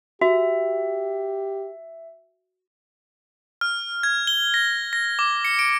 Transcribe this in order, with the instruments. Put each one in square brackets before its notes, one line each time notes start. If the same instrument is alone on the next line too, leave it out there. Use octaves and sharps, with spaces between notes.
[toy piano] F#4 [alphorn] G4 [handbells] E5
[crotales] F6
G#6
G7
A#6
A#6
D6
C#7
D7